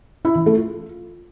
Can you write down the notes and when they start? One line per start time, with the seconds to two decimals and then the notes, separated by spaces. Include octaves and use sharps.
0.25 E4
0.35 E3
0.46 A3
0.57 F4